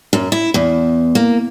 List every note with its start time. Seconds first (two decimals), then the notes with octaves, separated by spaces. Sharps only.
0.13 F#2
0.32 E4
0.54 E2
1.15 A#3